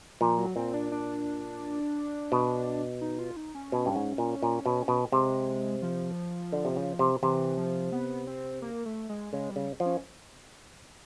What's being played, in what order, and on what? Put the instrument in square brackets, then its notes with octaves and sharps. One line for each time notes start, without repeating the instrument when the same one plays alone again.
[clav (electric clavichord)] A#2 [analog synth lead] F3
[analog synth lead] F#3
[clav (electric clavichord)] A#2 [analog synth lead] C4
[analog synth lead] D4
D4
[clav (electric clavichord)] B2
[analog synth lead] D#4
F4
D#4
C#4
[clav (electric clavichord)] B2
G2
G#2
A#2
A#2
B2
B2
[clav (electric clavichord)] C3 [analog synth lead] G#3
[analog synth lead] F3
[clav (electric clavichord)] D3
C3
C#3
C3
[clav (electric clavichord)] C3 [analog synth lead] E3
[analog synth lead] F3
B3
C4
A#3
A3
G#3
[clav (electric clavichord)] C#3 [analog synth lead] G#3
[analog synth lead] G3
[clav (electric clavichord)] C#3
F3
[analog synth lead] C#4